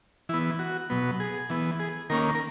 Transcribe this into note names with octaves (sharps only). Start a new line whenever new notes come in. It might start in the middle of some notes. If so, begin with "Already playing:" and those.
E3 B3 E4
F#4
B2 F#3 B3
G#4
E3 B3
G#4
D#3 A#3 C#4 A#4
A#4